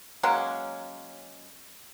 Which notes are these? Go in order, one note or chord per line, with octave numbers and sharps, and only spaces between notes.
F#3 G#3 A#3 C#4